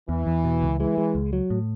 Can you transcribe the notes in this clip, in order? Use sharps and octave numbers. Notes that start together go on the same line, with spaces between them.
E2 E3
E2
B2
C#2
E3 G#3
G#3
C#2
F#3
A2